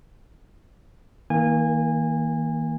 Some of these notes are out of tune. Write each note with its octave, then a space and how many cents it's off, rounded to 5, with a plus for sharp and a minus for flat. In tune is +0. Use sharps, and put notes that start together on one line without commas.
D#3 +40 A#3 +0 G#5 -25